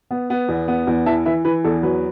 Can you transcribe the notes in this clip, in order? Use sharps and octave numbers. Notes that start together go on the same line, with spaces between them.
B3
B3
E2
B3
E2
E3 E5 A5
E3 B4 E5
E3 B4
E2 A4
F#3 B4